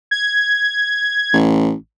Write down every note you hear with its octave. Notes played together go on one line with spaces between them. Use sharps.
G#6
A1